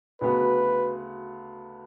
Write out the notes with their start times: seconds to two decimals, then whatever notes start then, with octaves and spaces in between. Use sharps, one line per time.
0.21 D2 C#3 F#3 B3 F#4 B4